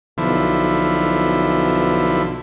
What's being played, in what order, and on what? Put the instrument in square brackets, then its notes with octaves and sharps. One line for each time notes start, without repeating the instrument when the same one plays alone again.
[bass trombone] B1 [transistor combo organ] D3 F3 E4